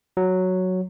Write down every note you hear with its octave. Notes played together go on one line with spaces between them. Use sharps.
F#3